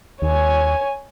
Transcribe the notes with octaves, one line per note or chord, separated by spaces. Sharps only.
D#2 C#5 G#5